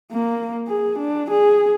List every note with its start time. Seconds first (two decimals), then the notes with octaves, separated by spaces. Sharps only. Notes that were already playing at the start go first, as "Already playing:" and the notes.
0.12 A#3
0.68 G#4
0.99 D4
1.31 G#4